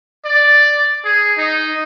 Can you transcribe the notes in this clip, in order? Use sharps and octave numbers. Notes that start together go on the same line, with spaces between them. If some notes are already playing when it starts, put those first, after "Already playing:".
D5
G#4
D#4